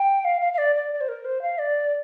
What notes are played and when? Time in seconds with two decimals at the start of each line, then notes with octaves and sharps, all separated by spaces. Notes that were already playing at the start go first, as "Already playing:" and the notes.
Already playing: G5
0.25 F5
0.41 F5
0.53 F5
0.58 D5
0.75 D5
0.93 D5
1.01 C5
1.08 A#4
1.25 C5
1.42 F5
1.58 D5